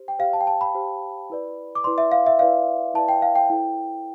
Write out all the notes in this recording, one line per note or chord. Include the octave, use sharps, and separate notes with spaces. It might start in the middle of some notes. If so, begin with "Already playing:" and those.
Already playing: G4 C5
G5
G4 C5 F5
A5
G5
A5
B5
G4 C5
E4 B4 D5
D6
E4 B4 D5 C6
E5
F5
E5
E4 B4 D5 F5
E4 B4 D5 A5
G5
F5
G5
E4 A4 C5